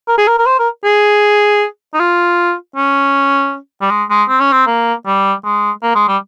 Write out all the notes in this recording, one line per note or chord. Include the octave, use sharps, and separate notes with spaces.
A#4
G#4
A#4
A#4
C5
A#4
G#4
D#4
F4
C#4
G3
G#3
G#3
C4
C#4
C4
A#3
G3
G#3
A#3
G#3
G3